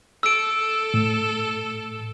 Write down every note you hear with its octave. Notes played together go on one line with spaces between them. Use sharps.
A4 E6 D7
A2